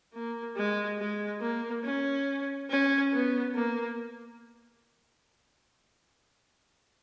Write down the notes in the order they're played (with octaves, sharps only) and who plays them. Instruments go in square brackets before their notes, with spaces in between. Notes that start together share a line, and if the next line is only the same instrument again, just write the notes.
[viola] A#3
G#3
G#3
A#3
C#4
C#4
B3
A#3